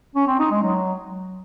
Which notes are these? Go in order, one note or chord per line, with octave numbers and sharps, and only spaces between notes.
C#4
C4
D#4
G#3
F#3